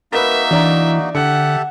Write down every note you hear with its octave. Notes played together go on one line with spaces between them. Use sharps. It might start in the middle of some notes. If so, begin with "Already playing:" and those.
A#3 D#4 F#4 A#4 B4 E5
E3 D4 D5 A#5
D3 G4 A4 E5 F#5 C#7